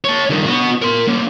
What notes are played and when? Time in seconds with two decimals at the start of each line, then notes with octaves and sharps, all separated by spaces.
0.04 C#5 A5
0.30 G2 D#3
0.46 B3 F#4
0.82 A#4 C6
1.08 A#3 C#4